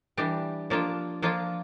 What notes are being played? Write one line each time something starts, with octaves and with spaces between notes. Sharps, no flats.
E3 G3 D4 G4
F3 A#3 D4 F4
F3 A#3 D4 F4